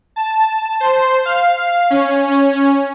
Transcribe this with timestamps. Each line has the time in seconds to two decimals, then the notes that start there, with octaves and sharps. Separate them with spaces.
0.16 A5
0.80 C5
1.25 F5
1.90 C#4
2.27 C#4